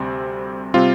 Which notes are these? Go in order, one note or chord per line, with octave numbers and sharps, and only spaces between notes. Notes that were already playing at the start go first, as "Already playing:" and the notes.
Already playing: D2 C3 G3 C4
C3 G3 C4 F4